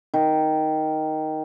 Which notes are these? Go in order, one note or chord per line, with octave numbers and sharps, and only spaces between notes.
D#3